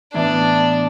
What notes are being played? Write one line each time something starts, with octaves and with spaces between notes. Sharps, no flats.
A2 E3 B3 D4